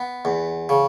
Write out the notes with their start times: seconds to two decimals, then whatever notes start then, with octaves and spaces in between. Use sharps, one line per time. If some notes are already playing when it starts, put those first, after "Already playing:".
Already playing: B3
0.25 E2
0.69 C#3